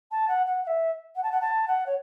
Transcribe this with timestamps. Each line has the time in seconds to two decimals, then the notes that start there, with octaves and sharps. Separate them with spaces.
0.11 A5
0.28 F#5
0.46 F#5
0.63 F#5
0.67 E5
1.15 F#5
1.23 A5
1.31 F#5
1.41 A5
1.67 F#5
1.86 C#5